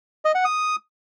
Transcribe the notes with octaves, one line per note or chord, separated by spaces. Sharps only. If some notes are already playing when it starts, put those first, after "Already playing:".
D#5
F#5
D#6